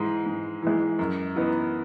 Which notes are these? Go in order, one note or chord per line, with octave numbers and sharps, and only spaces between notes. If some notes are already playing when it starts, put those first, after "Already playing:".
Already playing: G#2 E3 G#3
G#2
E3 G#3
F#2
E3 B3 D#4